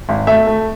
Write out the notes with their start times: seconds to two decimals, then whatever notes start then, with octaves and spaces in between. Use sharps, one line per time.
0.09 G#1
0.27 A3 E5
0.47 A3